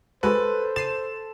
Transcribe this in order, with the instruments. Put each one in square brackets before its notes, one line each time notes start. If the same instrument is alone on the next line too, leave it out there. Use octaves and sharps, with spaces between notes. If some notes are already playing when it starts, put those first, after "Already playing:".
[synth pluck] G#3 F#4 [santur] A4 [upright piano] B4 [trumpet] C5
[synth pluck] A6 C7 D#7 [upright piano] E7